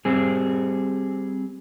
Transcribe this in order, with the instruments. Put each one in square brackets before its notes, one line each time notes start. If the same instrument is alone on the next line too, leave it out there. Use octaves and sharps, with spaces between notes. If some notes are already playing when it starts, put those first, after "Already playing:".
[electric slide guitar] G3 C4 G#4